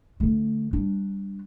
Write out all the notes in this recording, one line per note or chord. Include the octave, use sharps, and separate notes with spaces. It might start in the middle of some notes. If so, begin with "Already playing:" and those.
D3 A3
G3 D4